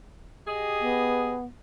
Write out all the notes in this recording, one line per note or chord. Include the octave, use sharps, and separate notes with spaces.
G4 G#4 D#5
B3